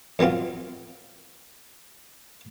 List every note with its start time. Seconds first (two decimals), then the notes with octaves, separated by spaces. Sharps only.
0.19 F2 F#3 B3 C4 F4